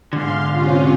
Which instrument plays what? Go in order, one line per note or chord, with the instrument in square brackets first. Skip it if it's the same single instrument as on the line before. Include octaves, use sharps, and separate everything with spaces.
[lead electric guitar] G#2 D3 [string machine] F5 C6
[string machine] C3 C#4 F4